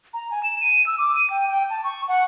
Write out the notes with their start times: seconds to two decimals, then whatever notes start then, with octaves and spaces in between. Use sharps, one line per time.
0.14 A#5
0.31 G#5
0.43 E7
0.61 D#7
0.86 E6
0.98 D6
1.16 D#7
1.30 G5
1.48 G5
1.70 A5
1.84 C#6
2.08 F#5